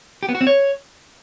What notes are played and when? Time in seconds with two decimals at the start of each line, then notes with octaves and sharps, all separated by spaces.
0.23 G4
0.29 B3
0.35 F#4
0.41 C4
0.47 C#5